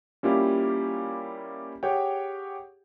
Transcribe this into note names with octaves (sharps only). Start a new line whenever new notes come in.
G3 A#3 C#4 E4 F4 G4
G4 G#4 C#5 F#5 G5